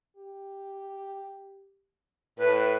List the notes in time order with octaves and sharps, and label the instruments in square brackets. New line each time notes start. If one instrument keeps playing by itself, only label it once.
[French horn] G4
[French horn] A2 [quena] B4